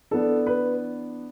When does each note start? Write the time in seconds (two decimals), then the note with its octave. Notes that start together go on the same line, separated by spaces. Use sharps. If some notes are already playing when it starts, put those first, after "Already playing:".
0.11 E3 B3 D4 A4
0.46 B4